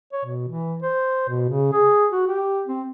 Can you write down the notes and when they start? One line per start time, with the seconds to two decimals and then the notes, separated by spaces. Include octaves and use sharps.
0.13 C#5
0.25 B2
0.48 E3
0.83 C5
1.29 B2
1.49 C#3
1.72 G#4
2.12 F#4
2.27 G4
2.66 C4